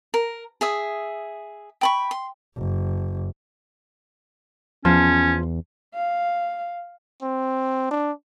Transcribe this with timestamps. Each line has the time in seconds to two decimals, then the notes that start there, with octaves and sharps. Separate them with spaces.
0.14 A#4
0.61 G#4 E5 D#6
1.81 G5 B5 C#6
2.11 C6
2.57 F#1
4.85 E2 F3 C#4
5.94 F5
7.22 C4
7.91 D4